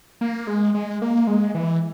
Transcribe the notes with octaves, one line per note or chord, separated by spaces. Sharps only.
A#3
G#3
G#3
A#3
G#3
E3